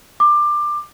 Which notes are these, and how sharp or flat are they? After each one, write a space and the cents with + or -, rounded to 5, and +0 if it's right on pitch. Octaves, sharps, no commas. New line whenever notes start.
D6 +20